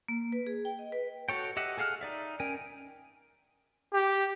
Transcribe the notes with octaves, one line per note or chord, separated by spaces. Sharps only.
A#3
B4
G#4
G5
D#5
B4
F#4 A4 C#5 G5
G4 D#5 E5 F#5
G#4 A4 F5 F#5 F6
D#4 D5 E5
C#4 A#4 G5 G#5
G4